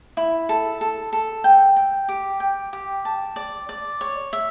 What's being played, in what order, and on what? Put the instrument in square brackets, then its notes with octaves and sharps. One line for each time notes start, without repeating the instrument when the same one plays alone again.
[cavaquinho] E4
A4
A4
A4
G5
G5
G4
G5
G4
A5
D5
D5
C#5
E5